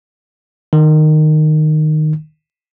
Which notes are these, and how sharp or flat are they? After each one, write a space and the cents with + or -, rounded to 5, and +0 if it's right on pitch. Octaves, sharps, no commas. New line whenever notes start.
D#3 -15